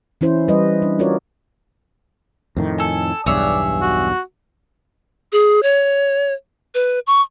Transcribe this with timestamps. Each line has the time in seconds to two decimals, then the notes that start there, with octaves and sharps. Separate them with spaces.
0.21 E3 C#4 E4 C5
0.48 G3 B4 D#5
0.82 D4
0.99 C#4 F4 F#4 A#4 C#5 D5
2.57 F2 A2 D#3
2.78 A4 G#5
3.26 B1 E2 G2 G#4 C#5 D5 E5
3.81 F#4
5.32 G#4
5.63 C#5
6.75 B4
7.07 C#6